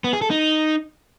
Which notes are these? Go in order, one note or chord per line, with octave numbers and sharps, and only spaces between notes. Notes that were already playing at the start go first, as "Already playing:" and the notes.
B3
G#4
A4
D#4